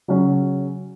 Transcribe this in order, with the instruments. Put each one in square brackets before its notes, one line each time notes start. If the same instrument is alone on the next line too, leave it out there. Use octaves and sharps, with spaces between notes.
[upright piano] C#3 F#3 C#4